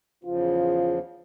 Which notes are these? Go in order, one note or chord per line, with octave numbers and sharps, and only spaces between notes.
E2 C#3 F3 F4